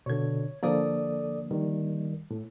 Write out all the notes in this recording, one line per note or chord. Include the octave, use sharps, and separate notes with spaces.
B2 D3 C#5 G#6
D3 F3 A#3 A4 D5 D#6
D#3 G3
A2